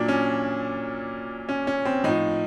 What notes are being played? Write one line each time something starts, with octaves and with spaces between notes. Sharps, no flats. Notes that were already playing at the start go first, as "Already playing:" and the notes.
Already playing: A#2 F#3 D4
C#4
C#4
C#4
C4
A2 F3 D#4